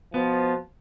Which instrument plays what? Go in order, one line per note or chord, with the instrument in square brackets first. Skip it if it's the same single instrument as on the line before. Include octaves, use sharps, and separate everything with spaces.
[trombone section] B2 F3 [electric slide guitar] B3